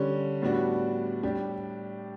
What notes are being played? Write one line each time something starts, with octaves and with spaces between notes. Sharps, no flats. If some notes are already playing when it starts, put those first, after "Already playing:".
Already playing: D3 G3 C#4
A2 G3 B3 D4 F#4
A2 G3 D4 G4